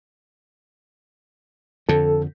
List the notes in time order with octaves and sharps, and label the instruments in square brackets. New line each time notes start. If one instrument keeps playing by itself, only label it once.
[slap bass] F2 D3 [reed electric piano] A4